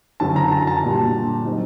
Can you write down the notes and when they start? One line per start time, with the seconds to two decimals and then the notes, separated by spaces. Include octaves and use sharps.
0.20 F#2 D3 F#3 A5
0.36 A#5
0.52 A5
0.67 A5
0.83 A#2 G3 D4
1.45 F#3 C4 D#4